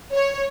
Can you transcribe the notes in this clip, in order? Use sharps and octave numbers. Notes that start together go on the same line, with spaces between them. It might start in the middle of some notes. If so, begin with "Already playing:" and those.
C#5